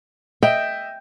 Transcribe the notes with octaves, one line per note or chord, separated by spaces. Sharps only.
D#5 E5 G5